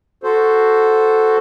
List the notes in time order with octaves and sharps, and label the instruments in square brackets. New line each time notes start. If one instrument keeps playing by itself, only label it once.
[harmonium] F#4 A4 C5